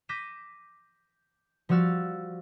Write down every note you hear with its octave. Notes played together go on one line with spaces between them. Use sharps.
D6 G6 A#6 B6 D#7 E7
F3 G3 F#4 E6 F6 A6